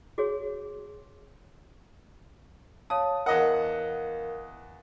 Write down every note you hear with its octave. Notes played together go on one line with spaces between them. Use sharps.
F#4 G#4 C#5
C#5 F5 A5 D#6
E2 A#4 D#5 F5 F#5